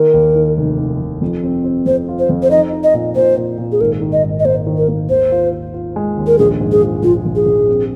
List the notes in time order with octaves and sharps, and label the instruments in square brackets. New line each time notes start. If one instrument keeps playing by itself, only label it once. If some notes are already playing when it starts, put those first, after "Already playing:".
Already playing: [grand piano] D#3 A#3 [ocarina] A#4
[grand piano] D#2
D#3
F1
D#3
F1
F2
C4
C4
[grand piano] F2 [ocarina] C5
[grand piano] F4
[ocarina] C5
[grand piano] F2
[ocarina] C5
[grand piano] D#4 [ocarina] D#5
[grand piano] D#4
[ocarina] D#5
[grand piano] A#2
[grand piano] A#2 [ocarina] C5
[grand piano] A#2
A#2
[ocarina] G#4
[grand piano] G#1 [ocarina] A#4
[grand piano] D#3
[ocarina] D#5
[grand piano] G#2
[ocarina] D#5
[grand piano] A#3 [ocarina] C5
[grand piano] D#3
[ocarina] A#4
[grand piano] A#3
[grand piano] D#2 [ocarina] C5
[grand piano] F4
F4
F4
G#3
D#2
[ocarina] A#4
[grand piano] A#1 [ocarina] G#4
[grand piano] G#2
[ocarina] G#4
[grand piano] F3
[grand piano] A#1 [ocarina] F4
[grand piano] A#1
[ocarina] G#4
[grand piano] A#1
C4